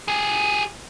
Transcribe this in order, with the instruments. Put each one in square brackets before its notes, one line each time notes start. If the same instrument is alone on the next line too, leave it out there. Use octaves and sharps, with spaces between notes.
[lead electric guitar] G4 G#4